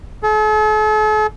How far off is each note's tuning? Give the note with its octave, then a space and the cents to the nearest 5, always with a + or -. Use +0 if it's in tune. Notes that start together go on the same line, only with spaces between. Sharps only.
A4 -45